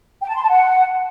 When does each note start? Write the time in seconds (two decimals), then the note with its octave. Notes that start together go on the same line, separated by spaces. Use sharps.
0.21 G5
0.28 A5
0.35 C6
0.41 A5
0.48 F#5